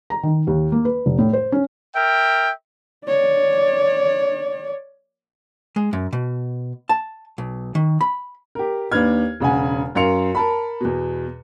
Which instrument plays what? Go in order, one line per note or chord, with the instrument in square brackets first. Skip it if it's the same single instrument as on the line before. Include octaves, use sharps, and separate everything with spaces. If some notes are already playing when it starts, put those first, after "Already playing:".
[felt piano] A#5
D#3
D#2
A#3
B4
F1
A2
C5
C#4
[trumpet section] A#4 E5 G5
[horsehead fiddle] C#5 D5
[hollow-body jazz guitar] G#3
F#2
B2
A5
B1
D#3
B5
[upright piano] G4 A#4
D#2 D4 B4 F6 G#6
E1 C#3 F#5 G#5
F#2 A#4 F5 C6 C#7 F7
A#4 A5 B5
E2 B2